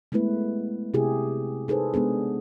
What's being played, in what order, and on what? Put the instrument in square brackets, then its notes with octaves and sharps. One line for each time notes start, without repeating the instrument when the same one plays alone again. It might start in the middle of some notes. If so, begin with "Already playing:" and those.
[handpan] G#3 A3 B3 E4 B4
C3 E4 G4 G#4
D#4 G#4 A4 B4 C5
G#3 B3 D4 G#4